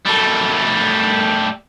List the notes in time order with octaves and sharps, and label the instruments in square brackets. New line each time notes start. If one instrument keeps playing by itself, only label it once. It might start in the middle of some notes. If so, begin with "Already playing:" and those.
[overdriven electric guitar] G3 A3